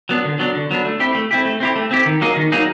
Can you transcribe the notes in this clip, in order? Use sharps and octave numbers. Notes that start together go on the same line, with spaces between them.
F#3 B3 D4
D3
F#3 B3 D4
D3
F#3 B3 D4
A3
C4 E4 G4
A3
C4 E4 G4
A3
C4 E4 G4
A3
C4 E4 G4
D#3
F#3 A#3 D#4 G#4
D#3
F#3 A#3 D#4 G#4